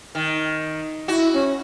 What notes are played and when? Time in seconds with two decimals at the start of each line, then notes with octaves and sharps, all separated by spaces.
0.15 D#3
1.08 E4 F#4
1.33 C#4